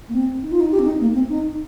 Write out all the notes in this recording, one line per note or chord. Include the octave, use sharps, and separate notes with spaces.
A#3
C4
D#4
F4
D#4
G4
C4
D#4
A#3
C4
D#4